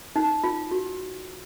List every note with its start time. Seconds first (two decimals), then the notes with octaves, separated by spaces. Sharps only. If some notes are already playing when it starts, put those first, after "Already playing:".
0.16 D#4
0.44 F4
0.71 F#4